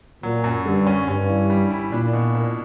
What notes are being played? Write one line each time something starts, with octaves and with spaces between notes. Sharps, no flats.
A#2 F#3
F#2
G2 D3
C#4
G2 C#4
E3
G3
E4
A#2 D4
B2
A#3